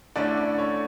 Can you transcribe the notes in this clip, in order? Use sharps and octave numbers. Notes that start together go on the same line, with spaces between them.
D3 A3 C#4 E4 D5
D5
C#5